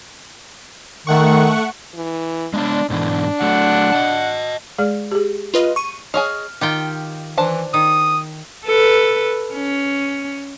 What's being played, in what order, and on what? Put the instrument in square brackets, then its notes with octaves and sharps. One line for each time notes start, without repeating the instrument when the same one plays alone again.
[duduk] D#3 [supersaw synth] A3 F#5 C#6
[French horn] E3
[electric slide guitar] G#3 B3 D5 [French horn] D4
[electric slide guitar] G#2 B2 E3 [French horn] D4
[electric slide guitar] F#3 A3 [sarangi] F#5
[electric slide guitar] D#5 A5
[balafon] G#3 G#4 D5
G4 G#4
[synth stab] F4 B4 D#5
C#6 D#7
[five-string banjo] G#4 C#5 D#5 [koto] F5
[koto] D#3 F4 G5 [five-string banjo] G4
[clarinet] E3 [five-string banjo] D4 C5 A5
[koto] D#3 [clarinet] D#6
[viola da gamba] A4 B4
C#4